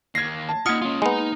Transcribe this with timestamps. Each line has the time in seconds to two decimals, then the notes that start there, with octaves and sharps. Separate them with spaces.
0.15 D#2 G#6 A#6 C7
0.49 A5
0.66 A#3 D#4 F4 F#5 D#6 F6 C#7
0.82 C#4 F4 C6
1.02 G#3 B3 D#4 A#5